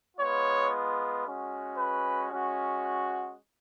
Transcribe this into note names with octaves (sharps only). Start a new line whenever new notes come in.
G#3 B3 F4 C#5
G#3 C#4 F#4
B4
G#3 C#4 F#4